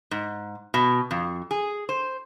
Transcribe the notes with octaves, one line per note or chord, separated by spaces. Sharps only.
G#2
B2
F2
G#4
C5